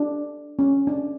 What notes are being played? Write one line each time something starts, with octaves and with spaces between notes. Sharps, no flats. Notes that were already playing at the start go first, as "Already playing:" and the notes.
Already playing: D4
C#4
D4